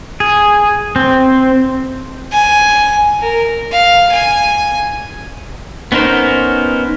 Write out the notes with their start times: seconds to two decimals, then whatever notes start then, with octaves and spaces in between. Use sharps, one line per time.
0.20 G#4
0.96 C4
2.33 G#5
3.21 A#4
3.71 F5
4.11 G#5
5.92 B3 C#4 D#4 A#4 C5